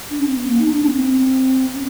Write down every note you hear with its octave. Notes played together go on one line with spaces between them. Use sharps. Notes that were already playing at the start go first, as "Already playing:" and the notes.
D4
C#4
C4
B3
A#3
D#4
D4
C#4
B3
C4
C#4